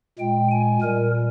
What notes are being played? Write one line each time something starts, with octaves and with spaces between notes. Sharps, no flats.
A#2 G#3 G5
G#5
A#2 G3 A#4